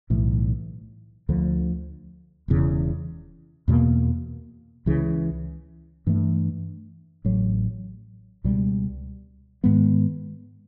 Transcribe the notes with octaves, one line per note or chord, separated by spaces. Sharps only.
B1 A2 E3 A3
D2 D3 F3
E1 E2 C#3
E2 B2 G3 A#3
C#2 C#3 E3
G2 E3 A3
A1 A2 F#3
C#2 B2 G3
G#2 D#3 G#3 B3